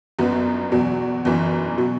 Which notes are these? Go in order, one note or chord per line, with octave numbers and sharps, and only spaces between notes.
G1 F#2 F#3 B3
E2 B2 F#3
G1 F#2 E3
B2 F#3